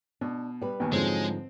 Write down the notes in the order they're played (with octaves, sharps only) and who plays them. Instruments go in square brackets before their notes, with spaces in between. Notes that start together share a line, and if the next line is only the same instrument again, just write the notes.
[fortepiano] B2 [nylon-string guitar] D4
[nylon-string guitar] G3 B4
[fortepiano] D#2 B2 [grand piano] G5 G#5
[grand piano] G#2 D3 F3 [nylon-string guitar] F#3 [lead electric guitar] G#3 [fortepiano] C4